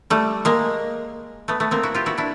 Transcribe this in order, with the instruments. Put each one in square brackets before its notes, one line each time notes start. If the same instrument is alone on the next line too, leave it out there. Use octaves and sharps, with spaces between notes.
[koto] G3 A3
G#3 A#3
A3 B3
A3 B3
A#3 C4
E4 F#4
F4 G4
E4 F#4
D4 E4